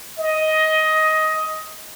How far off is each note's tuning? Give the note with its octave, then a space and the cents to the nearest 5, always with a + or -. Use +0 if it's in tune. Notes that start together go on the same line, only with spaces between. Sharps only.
D#5 +15